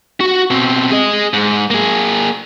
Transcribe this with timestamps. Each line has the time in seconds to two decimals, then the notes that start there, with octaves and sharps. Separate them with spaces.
0.21 F#4
0.50 B2 C4
0.92 G#4 D#5
1.33 G#2
1.70 A#3 G#4